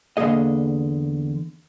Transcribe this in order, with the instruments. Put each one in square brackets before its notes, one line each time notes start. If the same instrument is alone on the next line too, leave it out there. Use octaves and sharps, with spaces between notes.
[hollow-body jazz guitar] E2 D3 D#3 A#3 G#4 D#5